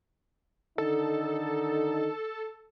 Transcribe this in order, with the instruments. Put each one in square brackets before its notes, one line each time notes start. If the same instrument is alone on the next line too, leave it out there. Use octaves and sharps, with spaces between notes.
[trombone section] D3 D#3 D#4 [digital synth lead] A4